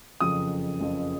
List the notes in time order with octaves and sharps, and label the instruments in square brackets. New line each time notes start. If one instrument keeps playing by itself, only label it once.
[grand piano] F#1 F2 C#3 F3 D#6
F#1 F2 C#3 F3